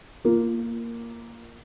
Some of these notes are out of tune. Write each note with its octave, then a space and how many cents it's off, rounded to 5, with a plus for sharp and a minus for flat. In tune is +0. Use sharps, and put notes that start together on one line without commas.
A#3 +0 F4 -25